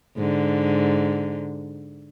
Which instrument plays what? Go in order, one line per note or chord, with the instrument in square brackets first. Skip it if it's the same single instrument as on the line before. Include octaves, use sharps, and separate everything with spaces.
[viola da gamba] G#2 D3